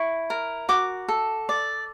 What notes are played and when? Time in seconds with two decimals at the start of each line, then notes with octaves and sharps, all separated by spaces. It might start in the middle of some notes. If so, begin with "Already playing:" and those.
Already playing: E4 C#6
0.30 A#4
0.69 F#4 D6
1.08 A4
1.49 D5